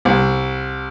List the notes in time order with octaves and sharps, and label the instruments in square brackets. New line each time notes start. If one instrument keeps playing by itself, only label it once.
[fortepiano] C2